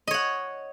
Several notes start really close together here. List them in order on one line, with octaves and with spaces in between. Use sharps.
D#5 C#5 F#5